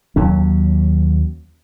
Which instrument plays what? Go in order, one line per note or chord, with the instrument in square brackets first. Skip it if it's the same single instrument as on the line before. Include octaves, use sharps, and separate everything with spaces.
[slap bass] D#2 F#3 C#4